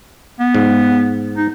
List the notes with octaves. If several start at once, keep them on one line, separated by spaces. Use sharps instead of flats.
B3
G#2
D#4